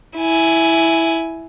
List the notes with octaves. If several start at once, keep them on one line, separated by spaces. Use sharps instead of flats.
E4 G#5